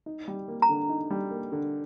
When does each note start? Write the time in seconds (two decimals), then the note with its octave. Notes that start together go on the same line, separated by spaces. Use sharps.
0.06 D#4
0.28 G3
0.48 A#3
0.62 A#5
0.69 D3
0.89 D#4
1.10 G3
1.31 A#3
1.52 D3